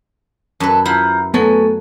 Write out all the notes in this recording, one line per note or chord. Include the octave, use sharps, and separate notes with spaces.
F#2 A4 B4 F#6
E4 F4 C5 F#5 A#5
F#3 A3 B3 F#4 A4 G#5